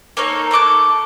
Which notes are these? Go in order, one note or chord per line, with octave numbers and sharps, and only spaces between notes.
A#3 D#4 A4 C#5
A3 A4 D6 F#6